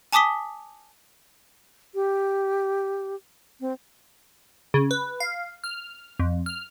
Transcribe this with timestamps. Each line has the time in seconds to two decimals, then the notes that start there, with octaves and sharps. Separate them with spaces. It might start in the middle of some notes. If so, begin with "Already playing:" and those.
0.13 G#5 A5 D6 D#6 B6 G7
1.95 G4
3.60 C4
4.74 C#3
4.91 B4
5.20 F5
5.64 F6
6.20 F2
6.46 F6